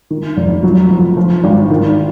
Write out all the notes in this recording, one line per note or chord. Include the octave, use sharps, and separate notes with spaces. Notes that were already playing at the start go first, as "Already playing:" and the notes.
D#3
F1
F#3
F2
F3
G#1
D#3